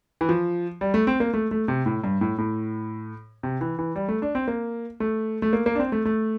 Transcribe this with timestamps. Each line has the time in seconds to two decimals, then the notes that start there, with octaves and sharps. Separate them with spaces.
0.21 E3
0.29 F3
0.81 G3
0.94 A3
1.07 C4
1.20 A#3
1.34 A3
1.51 A3
1.68 C3
1.86 A2
2.04 G2
2.21 A2
2.38 A2
3.43 C3
3.61 E3
3.79 E3
3.96 G3
4.09 A3
4.22 D4
4.35 C4
4.48 A#3
5.00 A3
5.42 A3
5.53 A#3
5.66 A#3
5.75 D4
5.79 C4
5.92 A3
6.05 A3